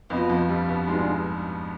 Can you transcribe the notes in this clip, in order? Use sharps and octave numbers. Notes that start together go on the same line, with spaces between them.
F2 B2 F3 B3 F4 B4 D#5
F2 F3
G2 G3
B2 B3
G#2 B2 G3 G#3 D4 F4 G#4